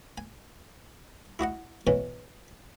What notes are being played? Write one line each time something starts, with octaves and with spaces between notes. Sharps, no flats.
G#5
E4 F#4 D#5 F#5
G#2 B2 E3 C#4 G#5